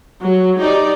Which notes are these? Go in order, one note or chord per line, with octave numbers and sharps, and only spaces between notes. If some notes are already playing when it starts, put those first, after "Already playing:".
F#3
D#4 G4 D5